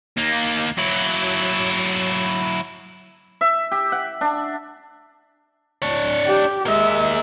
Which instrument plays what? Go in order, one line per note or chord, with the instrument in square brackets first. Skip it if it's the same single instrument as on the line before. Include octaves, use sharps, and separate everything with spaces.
[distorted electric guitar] D#2 A#3
F#3 E4
[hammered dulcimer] E5
G4
F#5
D4
[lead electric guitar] D4 C#5
[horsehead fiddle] G4
[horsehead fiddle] G#3 E5 [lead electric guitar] A#3 D#5